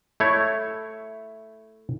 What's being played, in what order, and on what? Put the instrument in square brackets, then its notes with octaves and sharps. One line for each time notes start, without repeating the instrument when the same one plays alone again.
[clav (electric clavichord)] A3 E4 C#5